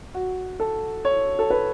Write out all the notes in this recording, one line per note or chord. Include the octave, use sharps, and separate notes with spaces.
F#4
A4
C#5
A4
B4